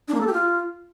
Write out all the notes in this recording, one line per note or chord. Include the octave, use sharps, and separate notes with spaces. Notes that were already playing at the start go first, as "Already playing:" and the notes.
D4
A#3
A4
G4
F4